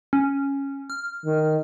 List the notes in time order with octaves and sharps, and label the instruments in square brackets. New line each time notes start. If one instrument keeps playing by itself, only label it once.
[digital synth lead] C#4
F6
[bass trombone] D#3